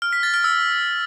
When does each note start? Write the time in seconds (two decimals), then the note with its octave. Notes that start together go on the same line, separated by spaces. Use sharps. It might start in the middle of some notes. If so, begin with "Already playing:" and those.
0.02 F6
0.13 B6
0.23 A6
0.34 F6
0.44 E6